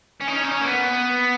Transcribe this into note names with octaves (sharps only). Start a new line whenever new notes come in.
C#4
D#4
C#4
D#4
C#4
A#3
B3